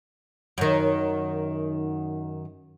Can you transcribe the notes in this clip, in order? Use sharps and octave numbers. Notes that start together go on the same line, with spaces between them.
F#2 D#3